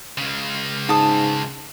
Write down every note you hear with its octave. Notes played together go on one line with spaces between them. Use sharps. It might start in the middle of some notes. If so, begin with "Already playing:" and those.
C#2 C#3
G#2 A5 D#6